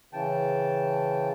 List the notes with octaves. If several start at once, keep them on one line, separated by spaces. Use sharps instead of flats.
C#3 E3 G5 A5